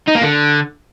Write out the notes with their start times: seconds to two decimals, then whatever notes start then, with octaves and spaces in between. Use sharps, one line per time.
0.08 D#4
0.15 A#3
0.23 D3